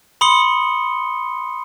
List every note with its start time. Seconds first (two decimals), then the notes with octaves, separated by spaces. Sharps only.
0.21 B5 C6 D#6 C#7 G7